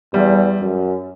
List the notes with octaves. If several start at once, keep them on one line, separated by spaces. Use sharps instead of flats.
E2 G3
F#2